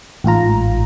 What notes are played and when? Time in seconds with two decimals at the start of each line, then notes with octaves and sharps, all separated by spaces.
0.24 A1 G#2 F4 A#5